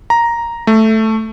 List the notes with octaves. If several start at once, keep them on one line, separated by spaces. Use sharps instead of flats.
A#5
A3